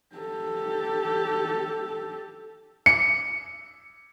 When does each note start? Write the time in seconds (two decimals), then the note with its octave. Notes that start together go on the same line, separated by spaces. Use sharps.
0.15 G4 A4
2.86 C#7